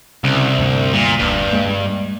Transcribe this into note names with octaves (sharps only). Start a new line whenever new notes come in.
C2 C#3
D2 G2
A#2
F1 D2 G2 A#2
G#3 A#3